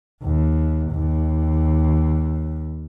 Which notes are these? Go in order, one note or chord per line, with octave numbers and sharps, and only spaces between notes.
D#2
D#2